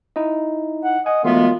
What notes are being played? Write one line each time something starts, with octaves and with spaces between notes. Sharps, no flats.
D#4 E4 D#5
F#5
D#5 F#5 G#5
F#2 E3 G#3 A3 B3 F4